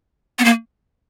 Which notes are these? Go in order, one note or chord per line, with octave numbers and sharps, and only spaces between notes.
B3
A#3